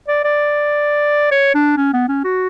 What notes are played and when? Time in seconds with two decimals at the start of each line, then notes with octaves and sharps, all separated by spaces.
0.08 D5
0.24 D5
1.31 C#5
1.55 D4
1.77 C#4
1.94 B3
2.09 C#4
2.24 F#4